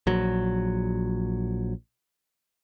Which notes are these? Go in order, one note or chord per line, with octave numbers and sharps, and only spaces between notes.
A#1 F#3